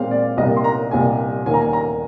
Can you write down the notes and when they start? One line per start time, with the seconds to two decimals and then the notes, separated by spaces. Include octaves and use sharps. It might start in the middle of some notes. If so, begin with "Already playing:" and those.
Already playing: A#2 G#3 C4 F5
0.11 D5
0.37 C2 A#2 G3 A#3 D#5
0.57 C6
0.64 A#5
0.91 C2 A#2 G3 A#3 G#5
1.46 D#2 D#3 A#3 G#5
1.54 A#5
1.61 G#5
1.73 A#5